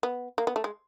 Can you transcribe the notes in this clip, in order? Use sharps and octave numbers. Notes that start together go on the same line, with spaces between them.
B3
A#3
B3
A3
G#3